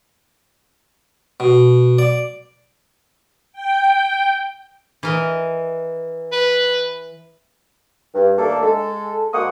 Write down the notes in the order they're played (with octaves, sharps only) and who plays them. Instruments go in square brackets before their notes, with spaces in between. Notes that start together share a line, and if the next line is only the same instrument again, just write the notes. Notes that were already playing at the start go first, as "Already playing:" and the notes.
[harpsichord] B2
D5
[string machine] G5
[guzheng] E3 A#4 D#5
[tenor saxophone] B4
[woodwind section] G2
D#2 A3 A#3 D4 A4
G#3 A4
D2 G#3 A#3 F#5 C#6 D#6